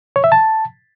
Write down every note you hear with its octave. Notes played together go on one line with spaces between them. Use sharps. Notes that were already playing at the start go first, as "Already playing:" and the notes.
C#5
E5
A5